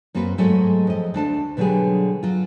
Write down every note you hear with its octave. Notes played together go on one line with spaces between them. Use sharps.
F#2 A#3 C4 F#4 B4
G#2 F#3 G#3 A3 G#4
F2 D#5
D2 D4 A5
B2 D3 F#3 G3 G4 G#4
F#3 F4